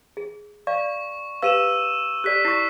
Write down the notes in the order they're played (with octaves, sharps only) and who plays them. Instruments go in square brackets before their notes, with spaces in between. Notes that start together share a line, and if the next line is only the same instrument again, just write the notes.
[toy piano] G#4
[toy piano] D5 F5 [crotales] C#6
[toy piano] G4 B4 F5 [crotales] E6 D#7 E7
[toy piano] G4 A4 D5 [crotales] F#6 B6
[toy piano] E4 D5 [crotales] C#6 C7